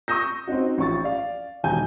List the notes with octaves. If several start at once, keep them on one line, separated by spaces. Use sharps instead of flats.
C#6 D#6 E6 G6 A#6
C4 C#4 D#4 F#4
A1 F3 C#6 A6
D5 F5
E1 D#3 G#5 G6